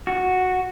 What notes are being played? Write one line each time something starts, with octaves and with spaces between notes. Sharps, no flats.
F#4